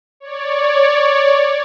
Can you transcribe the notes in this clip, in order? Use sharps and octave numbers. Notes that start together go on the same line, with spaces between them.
C#5 D5